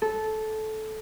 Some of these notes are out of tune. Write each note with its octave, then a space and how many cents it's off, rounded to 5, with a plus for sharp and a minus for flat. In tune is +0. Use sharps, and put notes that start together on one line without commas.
A4 -15